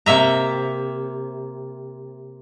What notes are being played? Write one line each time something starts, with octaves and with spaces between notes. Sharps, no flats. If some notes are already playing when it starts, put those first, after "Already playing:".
C3 A#3 E5 A#5